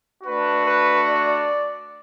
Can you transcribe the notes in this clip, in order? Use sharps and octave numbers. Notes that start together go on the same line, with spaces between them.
A3 D4 F#4 B4
B4
D5